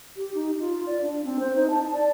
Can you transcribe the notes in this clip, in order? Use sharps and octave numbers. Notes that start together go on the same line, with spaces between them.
G4
D#4
F4
D5
D4
C4
C5
D#4
A5
D5